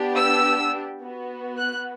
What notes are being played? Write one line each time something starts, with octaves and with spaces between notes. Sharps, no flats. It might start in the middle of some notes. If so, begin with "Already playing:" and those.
Already playing: B3 D4 G4
E6
B3 F#4
F#6